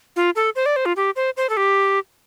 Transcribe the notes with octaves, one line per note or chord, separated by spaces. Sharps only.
F4
A4
C5
D5
C5
F4
G4
C5
C5
A4
G4